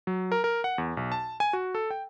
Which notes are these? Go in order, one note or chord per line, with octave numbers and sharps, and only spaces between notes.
F#3
A#4
A#4
F#5
E2
B1
A5
G#5
F#4
A4
G5